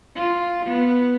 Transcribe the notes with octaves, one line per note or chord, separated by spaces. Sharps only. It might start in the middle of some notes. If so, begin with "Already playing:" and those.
F4
B3